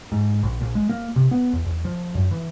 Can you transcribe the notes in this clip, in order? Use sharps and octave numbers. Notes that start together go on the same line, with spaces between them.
G#2
A#1
A#1
G#3
A#3
C3
B3
E2
E2
F3
F#2
E3